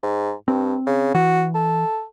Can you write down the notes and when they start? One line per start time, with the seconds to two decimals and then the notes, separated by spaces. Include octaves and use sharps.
0.03 G#2
0.48 G2 C4
0.87 C#3
1.14 E3 F#4
1.54 A4